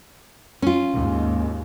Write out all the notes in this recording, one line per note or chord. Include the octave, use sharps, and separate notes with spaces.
C#4 F4
D#2 G#2